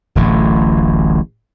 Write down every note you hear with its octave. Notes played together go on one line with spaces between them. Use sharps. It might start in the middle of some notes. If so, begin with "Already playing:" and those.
D1 A1 A2